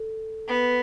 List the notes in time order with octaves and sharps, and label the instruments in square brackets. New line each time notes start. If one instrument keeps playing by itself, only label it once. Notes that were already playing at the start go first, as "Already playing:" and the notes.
Already playing: [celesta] A4
[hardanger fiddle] B3